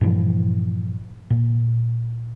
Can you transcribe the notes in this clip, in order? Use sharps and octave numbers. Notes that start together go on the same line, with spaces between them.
G2 A#2 E3 F3
A#2